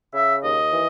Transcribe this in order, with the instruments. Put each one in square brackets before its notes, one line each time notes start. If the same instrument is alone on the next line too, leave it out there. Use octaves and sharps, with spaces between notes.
[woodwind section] C#3 E5
D#2 D#5
E3